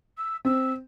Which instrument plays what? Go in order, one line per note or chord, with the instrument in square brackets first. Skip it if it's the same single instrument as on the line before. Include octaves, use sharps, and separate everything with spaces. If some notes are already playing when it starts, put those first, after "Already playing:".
[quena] E6
[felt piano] C4 [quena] E6